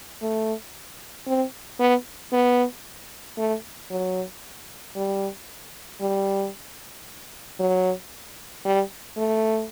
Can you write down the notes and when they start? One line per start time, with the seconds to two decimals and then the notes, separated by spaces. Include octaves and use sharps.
0.22 A3
1.27 C4
1.80 B3
2.32 B3
3.38 A3
3.91 F#3
4.96 G3
6.01 G3
7.59 F#3
8.65 G3
9.18 A3